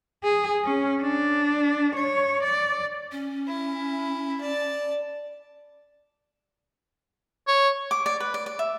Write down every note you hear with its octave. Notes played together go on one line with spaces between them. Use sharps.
G#4
C#4
D4
C#5
D5
C#4
E4
D5 A5
C#5
D6
D5
B4
D5
D5
E5